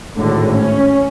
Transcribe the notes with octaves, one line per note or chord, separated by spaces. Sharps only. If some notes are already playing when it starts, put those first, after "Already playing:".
G#1 A2 D3
C#4